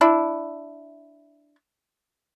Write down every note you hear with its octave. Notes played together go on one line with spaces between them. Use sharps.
D4 E4